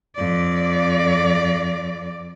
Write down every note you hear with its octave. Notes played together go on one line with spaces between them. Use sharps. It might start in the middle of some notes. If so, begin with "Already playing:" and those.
F2 D5